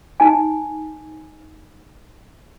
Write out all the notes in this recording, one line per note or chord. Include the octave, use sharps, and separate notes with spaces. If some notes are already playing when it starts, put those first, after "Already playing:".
D#4 G#5